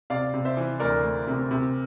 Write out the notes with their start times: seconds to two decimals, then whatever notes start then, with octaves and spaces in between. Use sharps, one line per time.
0.10 C3 D5 F5
0.34 C3
0.45 C5 E5
0.57 E3
0.80 D2 A#4 D5
1.03 D2
1.27 C3
1.51 C3